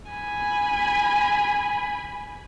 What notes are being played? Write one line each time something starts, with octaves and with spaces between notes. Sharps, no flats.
G#5 B5